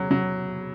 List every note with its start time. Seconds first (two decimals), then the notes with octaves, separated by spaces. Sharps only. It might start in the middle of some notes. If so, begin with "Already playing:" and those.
Already playing: E2 C#3 F#3
0.11 F#3